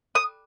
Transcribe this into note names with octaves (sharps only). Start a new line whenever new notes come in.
D#6